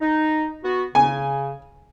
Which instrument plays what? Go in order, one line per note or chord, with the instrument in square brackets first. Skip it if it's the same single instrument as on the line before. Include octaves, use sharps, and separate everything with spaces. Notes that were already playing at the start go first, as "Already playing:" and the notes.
[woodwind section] D#4
B3 F#4
[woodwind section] C#3 [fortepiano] G#5